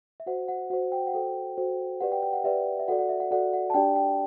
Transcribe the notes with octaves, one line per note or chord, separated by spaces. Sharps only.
E5
F#4 C5 F#5
F#5
F#4 C5 F#5
G5
F#5
F#4 A4 C5 G5
F#4 A4 C5
G4 B4 D5 F#5
G5
G5
F#5
G4 B4 D5 E5
E5
F#4 A4 D5 F#5
F#5
E5
F#5
F#4 A4 D5 F#5
F#5
A5
D4 G4 D5 G5
G5